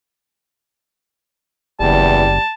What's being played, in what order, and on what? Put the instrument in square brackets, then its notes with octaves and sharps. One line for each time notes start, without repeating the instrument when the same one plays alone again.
[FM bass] F#1 [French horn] E2 [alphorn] G3 [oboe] A5